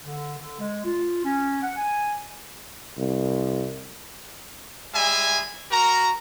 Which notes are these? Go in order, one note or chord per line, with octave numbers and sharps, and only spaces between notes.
D3
D3
G#3
F4
C#4
F#5
G#5
C2
G3 G#3 E5 G#5
F#4 A#4 A#5